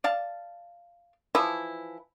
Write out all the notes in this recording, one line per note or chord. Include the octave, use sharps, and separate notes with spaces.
D5 F5 A5
E3 F3 E4